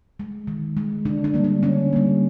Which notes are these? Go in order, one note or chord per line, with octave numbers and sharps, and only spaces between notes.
G#3
D#3
G#3
D3 D4
D4
G3 A#3
D4
D3 C#4
G3 A#3